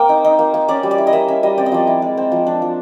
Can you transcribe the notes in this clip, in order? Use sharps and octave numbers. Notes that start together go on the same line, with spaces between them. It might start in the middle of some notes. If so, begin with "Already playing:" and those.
Already playing: A#3 C4 G5
D#4
D#4
A#3
A#3
C#4 D5
G3
D5
E4
D#5
A#3 E5
C#4 E5
G3 D#5
C4 D5
D#5
F3 D5
E4
G#3
C4
F3
D4
F3